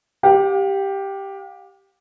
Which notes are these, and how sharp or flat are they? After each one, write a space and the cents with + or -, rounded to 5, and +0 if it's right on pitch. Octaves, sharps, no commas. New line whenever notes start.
G4 +0 F5 +40